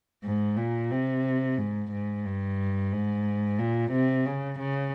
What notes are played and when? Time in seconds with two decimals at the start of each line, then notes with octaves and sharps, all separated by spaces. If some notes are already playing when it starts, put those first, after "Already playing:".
0.24 G#2
0.57 A#2
0.91 C3
1.58 G#2
1.91 G#2
2.25 G2
2.92 G#2
3.59 A#2
3.92 C3
4.25 C#3
4.59 C#3